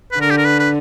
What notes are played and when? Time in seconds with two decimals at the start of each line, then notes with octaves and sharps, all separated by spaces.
0.12 B4
0.16 D3
0.21 A#4
0.31 G4
0.38 A#4
0.45 B4
0.60 B4